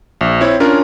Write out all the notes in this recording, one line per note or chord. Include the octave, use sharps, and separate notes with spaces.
A#1
C4 E4 C#5
C#4 D4 F4 A#4